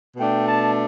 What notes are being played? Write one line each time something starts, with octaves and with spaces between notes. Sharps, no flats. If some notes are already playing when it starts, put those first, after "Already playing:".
B2 A3 D4 G5
A5